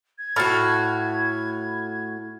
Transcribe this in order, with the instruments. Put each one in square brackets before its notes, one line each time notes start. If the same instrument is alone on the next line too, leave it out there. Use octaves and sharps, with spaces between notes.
[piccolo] G#6
[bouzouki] A2 F#4 [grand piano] B5 F6 A6